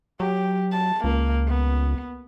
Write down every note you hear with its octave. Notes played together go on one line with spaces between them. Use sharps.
F#3 G4
A5
C#2 A#3
B3